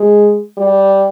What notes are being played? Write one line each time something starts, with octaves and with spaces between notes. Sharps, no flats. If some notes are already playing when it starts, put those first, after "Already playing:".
Already playing: G#3
G3